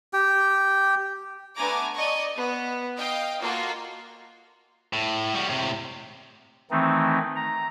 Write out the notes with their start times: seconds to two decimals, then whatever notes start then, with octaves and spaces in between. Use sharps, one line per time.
0.13 G4 G5
1.56 A3 B3 D4 G#5 A#5 D6
1.95 D5 D#5 C#6
2.36 B3
2.97 D#5 F5 G5
3.41 A#3 F4 F#4 A4
4.93 A2
5.34 G3 F#4
5.49 A2 C3
6.71 D#3 E3 A3 C4 D#4
7.36 A#5